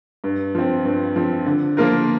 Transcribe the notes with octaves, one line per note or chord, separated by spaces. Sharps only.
G2
F3 C4
G2
F3 C4
D3
F3 A#3 F4 A#4